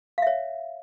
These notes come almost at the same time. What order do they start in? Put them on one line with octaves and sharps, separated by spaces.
F5 E5 C#5